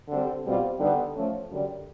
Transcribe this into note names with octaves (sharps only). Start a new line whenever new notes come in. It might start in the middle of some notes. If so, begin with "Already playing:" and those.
D3 G3 C4
B2 G3 C4 F4
D3 G3 B3 D#4 G4
F3 A3 C#4
F#2 D3 G3